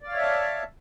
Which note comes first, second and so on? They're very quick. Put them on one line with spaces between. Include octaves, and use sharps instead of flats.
D5 F5 C#5 E5 A5